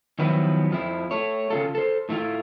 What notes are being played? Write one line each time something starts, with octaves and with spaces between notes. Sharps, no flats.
D#3 F3 F#3 B3 E4 B4
F2 F3 E4
A3 C#5
C#3 F4 A4
A4 C5
A2 A3 E4 F4